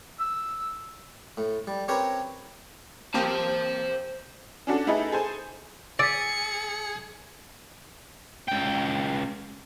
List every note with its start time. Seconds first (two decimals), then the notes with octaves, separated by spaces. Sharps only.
0.20 E6
1.38 A2
1.67 G3
1.88 C4 C#4 G4 A#4 B4 C#5
3.14 A#3 C4 G4 C5 A5
4.67 C#4 D4 F#4 A4
4.87 A3 D#4 E4 G#4 A4 B4
5.12 G#4 A4 C5 G#5
5.99 G#4 D5 E6 A6 B6 C#7
8.48 C#2 G5